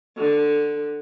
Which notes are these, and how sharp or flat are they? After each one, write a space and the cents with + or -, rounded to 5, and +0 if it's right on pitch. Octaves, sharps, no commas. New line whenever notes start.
D3 +10